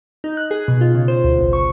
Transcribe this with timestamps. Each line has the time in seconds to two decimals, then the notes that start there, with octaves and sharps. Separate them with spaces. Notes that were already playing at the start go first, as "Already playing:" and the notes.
0.24 D#4
0.37 F#6
0.51 G#4
0.68 B2
0.81 F4
0.95 C#3
1.08 C5
1.24 D2
1.39 A1
1.53 C#6